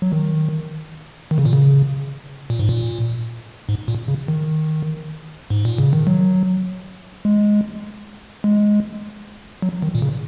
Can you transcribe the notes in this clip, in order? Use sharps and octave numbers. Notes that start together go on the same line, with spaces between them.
F#3
D#3
D#3
C#3
A#2
C#3
A#2
G#2
A#2
G#2
A#2
C#3
D#3
G#2
A#2
C#3
D#3
F#3
G#3
G#3
F#3
D#3
A#2
C#3